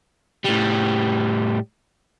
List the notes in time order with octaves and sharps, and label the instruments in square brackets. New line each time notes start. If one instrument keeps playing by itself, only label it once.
[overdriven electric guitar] A2 G3